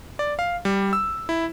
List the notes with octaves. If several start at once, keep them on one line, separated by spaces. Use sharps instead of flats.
D5
F5
G3
E6
E4